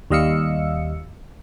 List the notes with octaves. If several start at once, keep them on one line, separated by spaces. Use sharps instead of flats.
D#2 G3 D#5 F5 E6 C#7